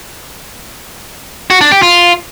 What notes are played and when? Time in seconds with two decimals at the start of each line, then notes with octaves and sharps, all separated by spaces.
1.50 F#4
1.61 D4
1.72 G4
1.82 F4